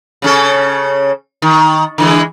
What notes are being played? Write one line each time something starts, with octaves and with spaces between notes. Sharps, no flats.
C#3 C#4 A4
D#3
D3 E3 G#3